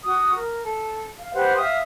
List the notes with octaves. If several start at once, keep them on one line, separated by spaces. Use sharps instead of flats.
F#4 D#6
A#4
A4
F5
G4 B4 C5 F#5
E5 F5 D#6